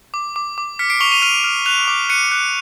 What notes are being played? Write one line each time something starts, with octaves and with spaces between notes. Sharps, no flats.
D6
D6
D6
F6 B6 C#7
C7 D7
C#6 F7 G7
D#7 F7
F6 D#7 F7
F6
F#6 D#7 F7
D6
F#6 C#7 D#7
F#6